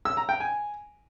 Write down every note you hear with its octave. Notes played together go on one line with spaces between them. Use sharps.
E6
A#5
G5
G#5